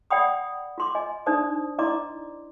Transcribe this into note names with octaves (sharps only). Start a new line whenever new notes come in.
D5 F#5 G5 B5 D#6
F4 C6 D6
D#5 G#5
D4 D#4 C5 D5 A5 D#6
E4 D5 D#5 A#5 C6 D6